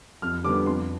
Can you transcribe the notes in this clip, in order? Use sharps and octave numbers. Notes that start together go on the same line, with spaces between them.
F2 F6
D3 G3 B3 D4 D6
F2 C6